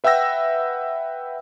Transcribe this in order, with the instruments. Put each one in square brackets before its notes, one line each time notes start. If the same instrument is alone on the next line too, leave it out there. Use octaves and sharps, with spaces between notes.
[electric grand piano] B4 E5 F#5 G5 E6 A#6